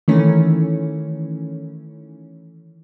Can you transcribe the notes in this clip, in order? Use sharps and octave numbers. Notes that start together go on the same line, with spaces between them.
D#3 E3 A3 C#4